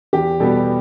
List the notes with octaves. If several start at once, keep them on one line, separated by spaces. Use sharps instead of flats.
E2 G4
B2 G3 B3 A4